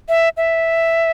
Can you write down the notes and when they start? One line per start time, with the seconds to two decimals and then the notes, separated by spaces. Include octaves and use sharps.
0.09 E5
0.37 E5